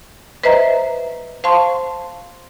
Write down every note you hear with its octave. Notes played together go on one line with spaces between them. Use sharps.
B4 C5 D#5 E5 A#5
C5 F5 A5 C6 C#6